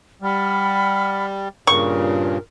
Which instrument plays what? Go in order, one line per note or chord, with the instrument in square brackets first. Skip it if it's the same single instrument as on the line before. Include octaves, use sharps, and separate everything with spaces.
[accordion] G3 [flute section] F#5 B5 F6
[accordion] G2 A#2 C#3 [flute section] A#4 [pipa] C#6